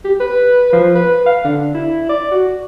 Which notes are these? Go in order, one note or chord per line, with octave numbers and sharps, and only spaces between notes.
G4
B4
F3
B4
F5
D3
E4
D5
F#4